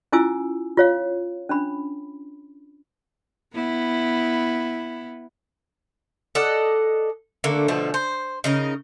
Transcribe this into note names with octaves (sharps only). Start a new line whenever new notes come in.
C#4 E4 F4 G#5 D6 E6
F4 C#5 F5
C#4 D4 B5
B3 E4
A4 D5 D#5 F#5
D3 A3 A#3
B2 D3 F3 A3
C5
C#3 D#4 A#4